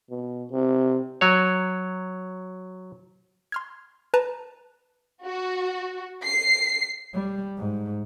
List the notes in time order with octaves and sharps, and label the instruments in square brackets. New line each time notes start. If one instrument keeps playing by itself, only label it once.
[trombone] B2
C3
[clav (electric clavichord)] F#3 C#5
[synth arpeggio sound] C6 F6 G#6
B4 A5 A#5
[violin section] F#4
C7
[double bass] G3
G#2